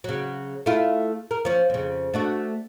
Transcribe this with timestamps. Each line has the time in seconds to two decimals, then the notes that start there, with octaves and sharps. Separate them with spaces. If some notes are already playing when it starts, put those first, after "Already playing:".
0.04 C#3 F#3
0.66 A3 E4 F4
1.31 A#4
1.45 F3 C#4
1.70 F2 C#3
2.14 A3 D4 F#4